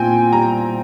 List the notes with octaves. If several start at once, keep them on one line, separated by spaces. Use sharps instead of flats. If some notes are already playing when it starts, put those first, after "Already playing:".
Already playing: A#2 C4 G5 G#5
G3 A#5